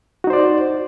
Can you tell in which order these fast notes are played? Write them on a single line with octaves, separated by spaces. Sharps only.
F#4 D#4 C5 D5